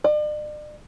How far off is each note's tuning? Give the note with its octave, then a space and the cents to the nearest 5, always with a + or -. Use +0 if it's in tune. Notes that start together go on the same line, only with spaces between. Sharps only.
D5 +40